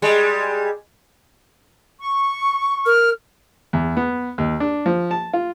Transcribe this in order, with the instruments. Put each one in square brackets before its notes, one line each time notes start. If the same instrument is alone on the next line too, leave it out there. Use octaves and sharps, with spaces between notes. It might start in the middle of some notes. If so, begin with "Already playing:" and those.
[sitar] G3 G#3
[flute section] C#6
[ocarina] A#4 [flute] F6
[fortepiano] E2
B3
D#2
D4
F3
A5
F4